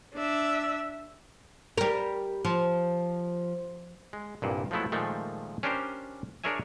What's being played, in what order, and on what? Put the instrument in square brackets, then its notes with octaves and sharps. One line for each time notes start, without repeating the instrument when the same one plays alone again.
[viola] D4 E5
[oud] G3 A#4
F3
[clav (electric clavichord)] G#3
C2 G2 A#2
F3 F#3 G#3 A3 B3 E4
A#2 D#3 F3 G#3 A3
C#4 D4 G4 A#4 C5
D4 G#4 A#4 C#5 E5 G#5